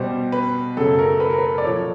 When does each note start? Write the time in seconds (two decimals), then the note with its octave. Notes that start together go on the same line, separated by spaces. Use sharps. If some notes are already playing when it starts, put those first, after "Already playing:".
Already playing: B2 G3 C5
0.32 B4
0.77 F#2 C#3 F#3 A3 A4
0.99 A#4
1.20 B4
1.30 A#4
1.38 B4
1.58 D5
1.64 A#2 F3 A3 C#5